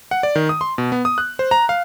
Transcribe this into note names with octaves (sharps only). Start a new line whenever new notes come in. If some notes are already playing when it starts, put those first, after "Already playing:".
F#5
D5
D#3
D#6
C6
B2
B3
D#6
F#6
C5
A#5
F5